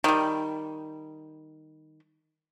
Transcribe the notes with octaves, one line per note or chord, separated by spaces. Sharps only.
D#3 G3